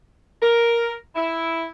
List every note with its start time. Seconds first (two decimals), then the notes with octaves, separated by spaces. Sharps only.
0.42 A#4
1.15 E4